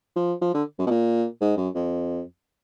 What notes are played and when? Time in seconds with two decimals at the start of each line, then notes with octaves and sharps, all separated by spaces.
0.16 F3
0.41 F3
0.54 D3
0.79 F#2
0.86 B2
0.91 A#2
1.41 G#2
1.57 F#2
1.75 F2